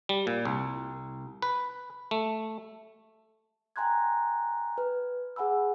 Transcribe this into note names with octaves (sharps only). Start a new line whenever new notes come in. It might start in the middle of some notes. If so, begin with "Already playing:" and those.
G3
A#2
C2
B4
A3
G5 G#5 A#5 C6 F#6 G#6
B4
G#4 F#5 G#5 B5 E6